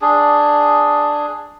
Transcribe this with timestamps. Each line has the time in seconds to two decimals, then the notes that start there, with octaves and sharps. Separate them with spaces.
0.01 D4 G#4